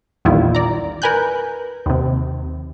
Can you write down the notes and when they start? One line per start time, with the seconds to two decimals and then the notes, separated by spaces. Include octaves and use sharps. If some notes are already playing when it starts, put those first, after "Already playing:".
0.25 A#1 E2 D#3 G3 E4 F4
0.55 D5 A#5
1.02 A#4 B4 G#5 F#6 G6
1.86 D#2 C3